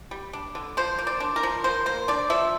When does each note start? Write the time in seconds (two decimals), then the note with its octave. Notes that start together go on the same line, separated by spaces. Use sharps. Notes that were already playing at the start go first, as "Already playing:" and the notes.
0.11 G3
0.33 D4
0.55 D3
0.77 F3 C5
0.99 A#3
1.07 D5
1.20 D4
1.36 A#4
1.43 F3
1.64 F3 C5
1.86 A#3 C5
2.08 D4 D5
2.30 F3 E5